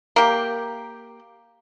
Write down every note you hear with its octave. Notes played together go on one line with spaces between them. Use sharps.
A#3 G4